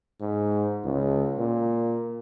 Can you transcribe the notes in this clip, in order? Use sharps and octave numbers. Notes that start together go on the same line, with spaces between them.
G#2
C#2
A#2